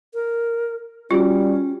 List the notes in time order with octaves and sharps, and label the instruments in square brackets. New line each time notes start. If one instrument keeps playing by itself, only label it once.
[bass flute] A#4
[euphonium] G3 [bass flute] C#4 [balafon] F4 F#4